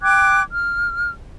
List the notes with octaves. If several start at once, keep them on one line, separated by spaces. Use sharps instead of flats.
G5 D6 F#6 G#6
F6